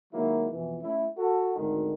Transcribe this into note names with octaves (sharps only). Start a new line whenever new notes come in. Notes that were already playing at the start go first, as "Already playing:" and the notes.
D#3 F#3 G#3 A#3 E4
F2 B2 E3
A3 C#4 E4
F#4 A4
G#1 D2 D3 D#3 G#3